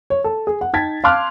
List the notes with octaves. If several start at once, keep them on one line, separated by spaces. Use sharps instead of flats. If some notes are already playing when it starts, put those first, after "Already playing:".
C#5
A4
G#4
F#5
D#4 G5 A5 G#6 A6 B6
F5 A5 C6 D6 F6 F#6